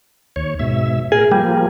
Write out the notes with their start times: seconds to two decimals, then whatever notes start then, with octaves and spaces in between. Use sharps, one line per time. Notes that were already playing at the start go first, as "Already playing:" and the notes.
0.36 D#2 C#5
0.59 G#2 B2 E5
1.12 A2 G#4 A#4
1.32 F3 G3 A#3